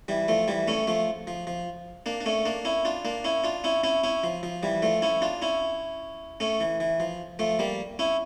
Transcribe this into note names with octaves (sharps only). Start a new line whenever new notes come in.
E3 G3
F3 A3
E3 G3
A3 C#4
F3 A3
F3
F3
A#3 D4
D4
A3 C#4
A#3 D4
C#4 E4
D4 F4
A#3 D4
C#4 E4
D4 F4
C#4 E4
C#4 E4
C#4 E4
F3
F3
E3 G3
F3 A3
C#4 E4
D4 F4
C#4 E4
A3 C#4
E3
E3
F3
F3 A3
G3 A#3
C#4 E4